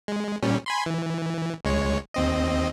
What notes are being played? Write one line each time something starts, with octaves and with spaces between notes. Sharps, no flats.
G#3
A#2 G3 C#4
G#5 B5 C6
E3
C#2 G#3 C#5
D#2 C4 D#5